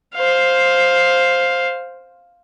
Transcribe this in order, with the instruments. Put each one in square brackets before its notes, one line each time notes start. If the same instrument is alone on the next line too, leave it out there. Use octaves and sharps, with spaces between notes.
[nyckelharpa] C5 F5